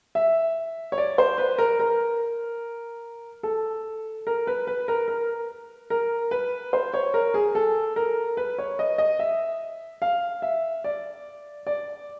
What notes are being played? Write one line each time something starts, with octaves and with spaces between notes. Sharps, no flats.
E5
C#5
D5
C5
B4
A#4
A#4
A4
A#4
B4
B4
A#4
A#4
A#4
B4
C5
C#5
A#4
G#4
A4
A#4
B4
C#5
D#5
D#5
E5
F5
E5
D5
D5